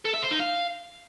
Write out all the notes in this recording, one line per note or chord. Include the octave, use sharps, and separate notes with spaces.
A4
E5
C5
D#4
F5